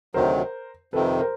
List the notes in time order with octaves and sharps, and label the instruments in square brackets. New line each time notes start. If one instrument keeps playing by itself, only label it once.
[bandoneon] D2 C3 D#3 F#3 [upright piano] A#4 C5
[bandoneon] F2 C3 D#3 [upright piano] A4 B4
[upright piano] A#4 C5